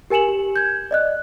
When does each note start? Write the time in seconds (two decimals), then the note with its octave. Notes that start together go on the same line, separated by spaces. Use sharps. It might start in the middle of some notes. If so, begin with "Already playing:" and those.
0.10 G4 A#4 G#5 C#7 E7 F#7
0.29 G4
0.56 G6 G#6
0.91 D5 D#5 F#6